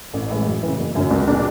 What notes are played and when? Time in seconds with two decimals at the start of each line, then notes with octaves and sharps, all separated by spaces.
0.14 A1
0.30 A2 E3 G#3
0.46 F#2
0.63 C#3 E3
0.79 F#1
0.95 F#2 D3 F#3 C#4
1.10 C#2
1.27 B2 G#3 D4